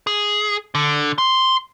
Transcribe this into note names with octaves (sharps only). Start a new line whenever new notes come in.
G#4
D3
C6